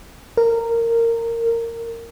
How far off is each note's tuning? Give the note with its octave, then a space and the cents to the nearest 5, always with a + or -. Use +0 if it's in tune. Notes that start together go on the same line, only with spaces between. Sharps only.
A#4 -15